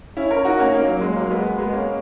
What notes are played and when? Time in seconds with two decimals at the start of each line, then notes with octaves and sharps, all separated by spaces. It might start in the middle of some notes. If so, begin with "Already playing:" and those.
0.17 C#4 E4
0.31 A#4 C#5
0.45 D#4 F#4
0.59 A#3 C#4
0.73 A#3 C#4
0.87 F#3
1.01 G#3
1.16 F#3 A#3
1.30 G#3 B3
1.58 G#3 B3
1.73 A#3 C#4